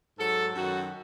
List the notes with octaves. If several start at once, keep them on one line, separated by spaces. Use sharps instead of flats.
G#2 F#3 A4
F#2 D#3 F#3 F#4